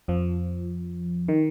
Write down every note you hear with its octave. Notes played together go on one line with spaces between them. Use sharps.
F2 F3
D#3